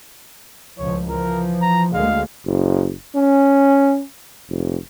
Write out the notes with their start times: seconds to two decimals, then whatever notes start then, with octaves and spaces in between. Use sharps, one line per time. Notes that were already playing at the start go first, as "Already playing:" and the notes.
0.78 C#2 A2 F3 C#5
1.09 E3 F3 A#4
1.61 A#5
1.94 D2 G#3 A#3 F5
2.46 F#1
3.16 C#4
4.49 F1